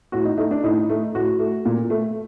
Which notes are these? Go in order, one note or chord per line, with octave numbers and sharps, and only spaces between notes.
A2 F#4
D#4
A3 D#4
D4
A2 D#4
A3
A2 F#4
A3
A#2
A3